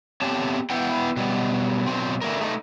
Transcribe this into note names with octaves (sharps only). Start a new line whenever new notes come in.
A3 B3 C4 G4 C#5 A5
B3 E4 B4 F#5 G5
B2 F#3 G3
B2 F#3 C4
D3 A3 G#4 A#4
A3 D#4